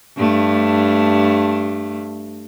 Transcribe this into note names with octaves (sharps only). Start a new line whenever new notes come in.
G2 A3